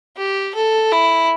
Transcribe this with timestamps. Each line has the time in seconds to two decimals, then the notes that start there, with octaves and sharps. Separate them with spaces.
0.17 G4
0.55 A4
0.92 E4